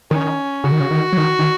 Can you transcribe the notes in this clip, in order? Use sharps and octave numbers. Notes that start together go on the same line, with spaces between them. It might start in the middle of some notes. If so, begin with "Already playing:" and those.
D#3 C#4
C#3 F#4
D#3
C#3
D#3
F#3
D#3
D#3